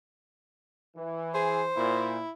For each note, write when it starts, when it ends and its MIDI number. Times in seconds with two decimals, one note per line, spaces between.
0.96 1.71 52
1.34 1.63 68
1.34 2.23 72
1.76 2.20 46
1.76 2.31 64